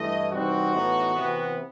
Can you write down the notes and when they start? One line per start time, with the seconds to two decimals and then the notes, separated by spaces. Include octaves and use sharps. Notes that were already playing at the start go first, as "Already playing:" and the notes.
Already playing: G2 E3 A3 E4 D#5
0.31 C3 E3 G3 C4 D#4 F#4
0.72 A2 E3 B3 D#4
1.14 C3 E3 B3